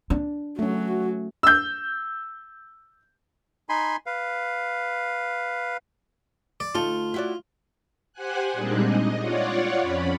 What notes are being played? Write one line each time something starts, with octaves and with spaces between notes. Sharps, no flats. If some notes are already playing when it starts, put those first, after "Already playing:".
D4
F#3 A3 C#4 F#4
E6 G6
D#4 G#5 B5 C6
B4 F5
D5
D2 D#4 F4 A4
E4 F#4 D5
G4 C5 F#5 G#5 F#6
A#2 G3 G#3 C4 D4 D#4
D#5
F4 C#5 D5 F#5
F2 C#4 B5